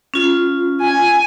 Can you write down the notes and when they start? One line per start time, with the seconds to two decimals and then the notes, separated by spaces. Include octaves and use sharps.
0.14 C#4 F4
0.81 G#5